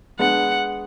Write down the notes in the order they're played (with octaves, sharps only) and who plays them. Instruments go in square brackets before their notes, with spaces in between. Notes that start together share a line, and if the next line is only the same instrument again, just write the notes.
[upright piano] G#3 B3 D4 [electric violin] F#5